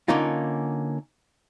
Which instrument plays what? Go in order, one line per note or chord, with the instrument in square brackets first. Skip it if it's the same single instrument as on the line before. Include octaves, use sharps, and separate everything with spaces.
[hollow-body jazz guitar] D3 A#3 C#4 D#4 F4